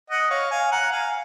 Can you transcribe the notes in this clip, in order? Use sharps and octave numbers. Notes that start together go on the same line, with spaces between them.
D#5 F#5
C#5 F5
F5 G#5
F#5 A#5
F5 G#5